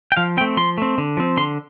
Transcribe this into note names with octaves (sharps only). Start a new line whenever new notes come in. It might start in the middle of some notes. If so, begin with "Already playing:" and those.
G5
F3 F5
A3 C4 G5
F3 C6
A3 C4
D3
F3 C4
D3 C6